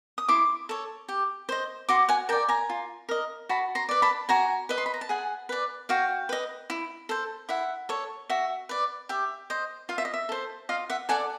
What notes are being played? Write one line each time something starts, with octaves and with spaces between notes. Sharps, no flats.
D#6
E4 C6 D6
A4 C#5
G4
C5 D#5
F#4 C6 D6
F#5 G#5
A#4 D5 G5 A5
G#5 A#5
F4
A#4 D#5
F#4 A5 B5
A#5 C6
B4 D5
A5 B5
F#4 G#5 A#5
B4 D#5
C6
B5
A#5
A5
G#4 F#5 G#5
B4 D5
F#4 F5 G5
B4 D#5
E4
A4 C5
E4 E5 F#5
A4 C#5
F#4 E5
B4 D5
G4 E5
C5 D#5
F4 F5
E5
D#5
E5
A4 C5
F4 D#5 F5
E5 F#5
A4 D5 F#5 G#5